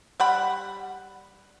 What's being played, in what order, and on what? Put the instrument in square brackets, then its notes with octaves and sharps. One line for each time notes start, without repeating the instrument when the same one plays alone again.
[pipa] G3 F#5 B5